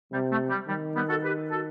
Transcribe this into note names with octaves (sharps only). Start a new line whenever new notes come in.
C3 G3
A3
G3
D#3 G3
G3 B3
F#4 A4
G4 B4
F#4 A4